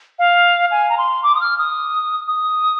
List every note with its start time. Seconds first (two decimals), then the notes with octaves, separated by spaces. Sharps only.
0.19 F5
0.71 G#5
0.89 A#5
0.97 C6
1.23 D6
1.35 D#6
1.41 F6
1.58 D#6
2.27 D#6